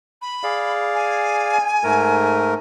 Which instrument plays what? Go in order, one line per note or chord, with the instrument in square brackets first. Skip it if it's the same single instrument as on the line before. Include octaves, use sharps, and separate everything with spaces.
[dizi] B5
[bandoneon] G#4 D5 F5
[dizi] G#5
[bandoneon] G#2 A3 A#4